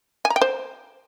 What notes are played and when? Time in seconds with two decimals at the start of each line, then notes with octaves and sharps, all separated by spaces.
0.25 G#5
0.30 A#5
0.36 G5
0.41 C5